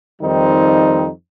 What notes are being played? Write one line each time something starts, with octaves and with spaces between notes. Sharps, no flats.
F2 D#3 G3 C4 D#4